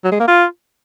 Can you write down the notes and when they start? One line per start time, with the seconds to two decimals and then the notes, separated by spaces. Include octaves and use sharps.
0.04 F#3
0.12 G#3
0.20 A#3
0.28 F4